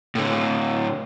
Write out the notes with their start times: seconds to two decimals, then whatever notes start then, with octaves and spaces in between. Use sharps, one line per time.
0.15 A2 D3